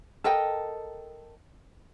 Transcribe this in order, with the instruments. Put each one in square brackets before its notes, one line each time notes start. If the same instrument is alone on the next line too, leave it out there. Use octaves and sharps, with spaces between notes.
[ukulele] A4 A#4 D#5 G5